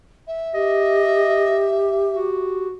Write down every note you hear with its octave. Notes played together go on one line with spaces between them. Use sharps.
E5
G4 D#5
F#4